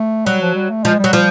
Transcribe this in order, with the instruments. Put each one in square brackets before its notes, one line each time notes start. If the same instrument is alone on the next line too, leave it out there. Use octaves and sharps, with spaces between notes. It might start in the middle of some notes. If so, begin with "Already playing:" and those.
Already playing: [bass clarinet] A3
[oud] F#3 [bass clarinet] G3
[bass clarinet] F3
G3
A3
[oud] F3 [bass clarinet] G#3
[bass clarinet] G3
[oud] F#3
F3